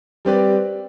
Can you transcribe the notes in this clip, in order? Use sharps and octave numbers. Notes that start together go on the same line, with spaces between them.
G3 C4 G4 B4 D5